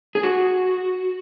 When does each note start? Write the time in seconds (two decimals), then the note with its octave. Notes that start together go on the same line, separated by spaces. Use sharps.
0.15 G#4
0.23 F#4